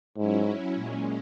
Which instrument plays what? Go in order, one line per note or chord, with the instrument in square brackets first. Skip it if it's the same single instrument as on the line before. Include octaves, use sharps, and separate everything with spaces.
[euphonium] G#2 [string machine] F#3 C#4 E4
[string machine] A#2 G#3 C#4